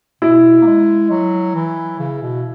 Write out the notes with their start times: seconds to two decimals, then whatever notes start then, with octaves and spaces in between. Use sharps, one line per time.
0.22 B2 E4
0.61 A#3
0.67 G#3
1.10 F#3
1.55 E3
1.99 C#3
2.22 B2